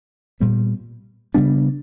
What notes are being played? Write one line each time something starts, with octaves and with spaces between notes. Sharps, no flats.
A#2 G3 B3
C#3 G3 B3 D4